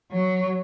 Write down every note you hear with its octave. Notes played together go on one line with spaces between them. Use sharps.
F#3